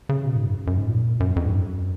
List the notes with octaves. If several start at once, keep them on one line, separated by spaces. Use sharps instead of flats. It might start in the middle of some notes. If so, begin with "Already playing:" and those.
C#3
B2
G#2
F#2
F#2
G#2
A#2
F#2
F2
G#2
F#2